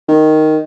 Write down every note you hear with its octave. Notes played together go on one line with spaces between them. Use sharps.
D#3